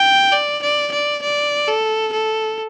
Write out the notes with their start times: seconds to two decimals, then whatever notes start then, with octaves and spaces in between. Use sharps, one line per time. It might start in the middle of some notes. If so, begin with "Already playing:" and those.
Already playing: G5
0.32 D5
0.63 D5
0.92 D5
1.22 D5
1.68 A4
2.12 A4